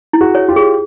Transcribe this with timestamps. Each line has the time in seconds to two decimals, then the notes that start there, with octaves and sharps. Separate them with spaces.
0.13 E4
0.21 F#4 G#4
0.35 C#5
0.49 F4 G4
0.56 G#4